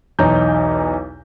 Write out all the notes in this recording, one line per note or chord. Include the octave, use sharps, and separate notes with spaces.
B1 E2 D#4 C#5 A#5 G6